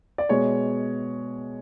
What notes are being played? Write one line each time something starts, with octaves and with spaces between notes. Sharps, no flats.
D5
B2 G#3 B3 C#5